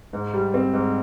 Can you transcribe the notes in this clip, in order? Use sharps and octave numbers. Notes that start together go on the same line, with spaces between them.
G#2
G3
C4
G#2